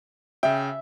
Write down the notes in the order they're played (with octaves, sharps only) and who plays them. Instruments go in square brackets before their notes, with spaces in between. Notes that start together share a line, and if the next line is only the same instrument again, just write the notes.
[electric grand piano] C#3 G5 [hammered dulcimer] E5